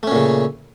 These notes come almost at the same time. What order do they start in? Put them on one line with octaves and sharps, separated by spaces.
A3 C#4 A#2 C#3